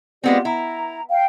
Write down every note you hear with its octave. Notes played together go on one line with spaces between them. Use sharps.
G#3 B3 C4 F4 G4 D5
E4 A#5
F5 G5